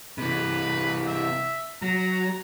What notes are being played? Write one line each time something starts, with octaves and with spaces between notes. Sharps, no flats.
C3 E3 B4
E5
F#3 A#5